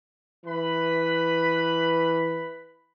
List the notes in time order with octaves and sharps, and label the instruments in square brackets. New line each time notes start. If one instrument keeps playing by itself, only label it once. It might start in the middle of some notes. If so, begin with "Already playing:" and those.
[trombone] E3 [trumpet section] B4 B5